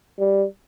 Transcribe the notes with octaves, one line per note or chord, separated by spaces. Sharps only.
G3